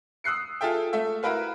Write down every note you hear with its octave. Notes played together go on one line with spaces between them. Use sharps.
D#6 E6 F#6 C7 C#7
F4 G#4 A4 E5 G5
A3 A4 E5
E4 F#4 A#4 B4 F5